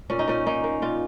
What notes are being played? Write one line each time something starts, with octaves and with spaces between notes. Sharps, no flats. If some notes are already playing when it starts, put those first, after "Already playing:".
A#2 C#4
D#4
A#2 C#4
A#3 D#4
A#3
A#2 F4